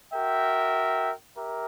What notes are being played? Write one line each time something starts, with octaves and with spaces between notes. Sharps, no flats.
F#4 A#4 E5 G5
G4 A#4 E5